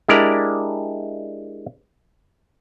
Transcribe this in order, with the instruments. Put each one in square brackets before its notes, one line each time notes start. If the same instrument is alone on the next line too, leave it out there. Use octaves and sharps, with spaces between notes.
[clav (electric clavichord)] G#3 D4 E4 G4 A#4 D5